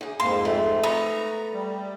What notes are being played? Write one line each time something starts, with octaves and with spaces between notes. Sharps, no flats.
D2 G#4
F2 G#2 A#3 C6
A3
B3 A#5 C#6
G3